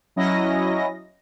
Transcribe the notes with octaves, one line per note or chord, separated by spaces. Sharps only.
F#3 C#4 E4 D#5 A#6